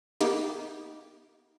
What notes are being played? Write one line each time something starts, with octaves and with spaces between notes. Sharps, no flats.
A#3 B3 D#4 G4